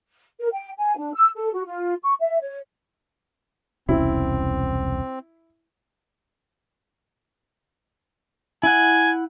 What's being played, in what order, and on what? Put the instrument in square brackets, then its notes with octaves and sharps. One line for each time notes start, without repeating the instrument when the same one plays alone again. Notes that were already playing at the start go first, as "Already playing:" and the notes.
[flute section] A#4
G5
G#5
D4
E6
A4
F#4
F4
C#6
E5
C#5
[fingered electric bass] E1 C2 C#4 [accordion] C4 [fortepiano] E4
[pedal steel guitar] E4 F#5 [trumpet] G#5